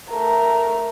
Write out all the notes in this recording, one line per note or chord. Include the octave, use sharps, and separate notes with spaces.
A3 A#4